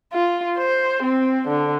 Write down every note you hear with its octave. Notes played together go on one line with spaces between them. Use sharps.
F4
C5
C4
D3